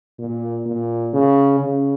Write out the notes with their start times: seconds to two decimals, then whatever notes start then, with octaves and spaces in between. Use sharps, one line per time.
0.19 A#2
0.66 A#2
1.13 C#3
1.60 C#3